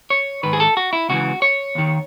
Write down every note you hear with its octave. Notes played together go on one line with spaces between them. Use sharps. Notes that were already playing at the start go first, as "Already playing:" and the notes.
C#5
G#2 D#3 B4
G#4
A4
F#4
E4
C#2 C#3 E3 F#4
C#5
D#2 D#3